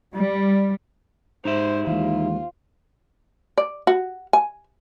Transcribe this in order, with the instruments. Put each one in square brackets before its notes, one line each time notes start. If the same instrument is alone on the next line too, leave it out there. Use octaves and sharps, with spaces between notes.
[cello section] G3
[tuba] G#2 [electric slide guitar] D#4 G4 E5 [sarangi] C5
[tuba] D#2 [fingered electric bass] E3 G#3 [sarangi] F4
[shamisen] D5
F#4
G#5